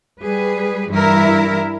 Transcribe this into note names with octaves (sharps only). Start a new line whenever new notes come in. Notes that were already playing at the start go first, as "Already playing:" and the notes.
G3 G#4 B4
G2 E3 E4 A#4